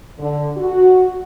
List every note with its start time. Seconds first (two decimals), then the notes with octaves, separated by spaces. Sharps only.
0.19 D3
0.57 F#4